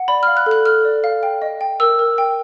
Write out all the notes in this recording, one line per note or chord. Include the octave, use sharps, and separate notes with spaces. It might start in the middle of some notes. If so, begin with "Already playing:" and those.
Already playing: F#5
D5 B5
F6
F5
F#6
A4
F#6
A4 F6
D5
F5
G5
D#5
G5
A#4 E6
A#4
G5